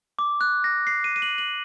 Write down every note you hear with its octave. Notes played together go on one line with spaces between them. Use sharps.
D6
F#6
A#6
C7
D#7
D#7
F#7
F#7